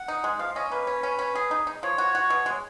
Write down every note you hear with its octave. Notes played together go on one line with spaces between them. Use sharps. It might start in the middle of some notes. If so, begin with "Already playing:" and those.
Already playing: F#5
D#4
G#3
F3 F5
C#4 D#5
A#3 B4
C#4
C#4
C#4
G#4
D#4
D#4
F3 C#5
F#4
F#4
B2
G#3